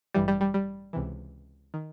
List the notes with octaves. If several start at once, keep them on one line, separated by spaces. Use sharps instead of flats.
A1 G2 E3 G3
G3
G3
G3
C#2 C3 E3
D#3